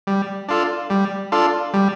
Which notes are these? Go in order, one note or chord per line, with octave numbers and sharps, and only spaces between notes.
G3
D4 F4 A4
G3
D4 F4 A4
G3